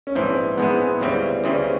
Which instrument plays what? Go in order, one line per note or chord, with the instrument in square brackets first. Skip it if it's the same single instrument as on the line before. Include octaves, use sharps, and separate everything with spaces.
[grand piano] C#4
[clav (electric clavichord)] A#1 G#2 E3 G#3 [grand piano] C4
[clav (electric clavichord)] A#1 G#2 E3 G#3 [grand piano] B3
[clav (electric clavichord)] D2 C#3 E3 G3 C4
[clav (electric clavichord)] D2 C#3 E3 G3 C4 [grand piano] C#4